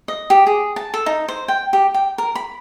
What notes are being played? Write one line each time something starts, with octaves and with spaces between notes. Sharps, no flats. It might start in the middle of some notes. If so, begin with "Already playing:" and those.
D#5
G4
G#4
A5
A4
D#4
C5
G5
G4
G5
A#4
B5